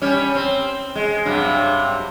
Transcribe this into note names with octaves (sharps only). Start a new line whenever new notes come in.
G3 C#4
C4
G#3
G2 C3 F#3